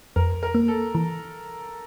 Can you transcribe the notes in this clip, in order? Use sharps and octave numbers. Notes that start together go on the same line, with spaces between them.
F2 A#4
A#4
A#3
A4
E3